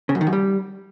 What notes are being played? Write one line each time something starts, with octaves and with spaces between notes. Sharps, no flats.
C#3
F#2
D#3
F#2
G3